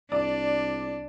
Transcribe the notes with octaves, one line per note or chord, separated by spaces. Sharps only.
C2 D4 D5